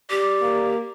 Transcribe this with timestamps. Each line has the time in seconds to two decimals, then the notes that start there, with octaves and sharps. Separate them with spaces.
0.10 G4 D5
0.41 A#3